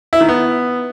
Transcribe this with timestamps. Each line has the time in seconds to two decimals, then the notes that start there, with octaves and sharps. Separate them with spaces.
0.13 E4
0.21 D#3
0.29 B3